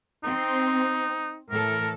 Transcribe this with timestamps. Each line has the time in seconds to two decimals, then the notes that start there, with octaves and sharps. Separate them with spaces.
0.24 C4 D#4
1.50 A2 E3 A4 A#4